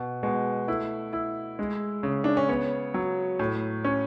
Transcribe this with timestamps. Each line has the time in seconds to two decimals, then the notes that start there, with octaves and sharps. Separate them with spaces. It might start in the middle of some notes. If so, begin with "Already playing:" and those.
Already playing: B2
0.23 B2 G#3
0.68 A3 E4
1.13 E4
1.59 G#3
2.03 C#3
2.24 D4
2.37 C#4
2.49 B3 C#5
2.94 F#3
3.39 A2
3.85 C#4